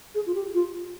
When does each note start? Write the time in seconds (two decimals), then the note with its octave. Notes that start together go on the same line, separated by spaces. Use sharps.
0.15 G#4
0.26 F4
0.35 G4
0.54 F4